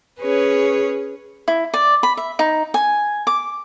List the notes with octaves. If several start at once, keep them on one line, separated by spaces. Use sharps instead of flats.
C#4 G#4 B4 C#5
E4
D5
B5
E5
D#4
G#5
D6